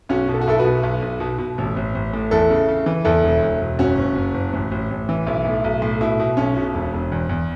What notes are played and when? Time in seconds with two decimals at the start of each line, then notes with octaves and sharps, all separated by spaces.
0.09 B1 C#4 F#4
0.28 B2
0.34 A4
0.41 F#4
0.47 B1 E4 A4
0.59 F#4 B4
0.65 B2
0.83 B1
1.02 B1
1.20 B2
1.39 B2
1.58 A1
1.76 A1
1.95 A1
2.14 A2
2.31 E2 E4 A4
2.50 C#3
2.68 C#3
2.86 E3
3.05 E2 E4 A4
3.24 E1
3.43 E1
3.61 E1
3.79 F#1 C#4 F#4
3.98 F#1
4.15 F#1
4.34 F#1
4.53 A1
4.71 A1
4.90 A1
5.09 E3
5.27 B1 E4
5.46 A2
5.64 B1
5.82 A2
6.01 B2 E4
6.20 B2
6.37 B1 C#4
6.57 B2
6.74 E1
6.93 E1
7.12 E2
7.29 E2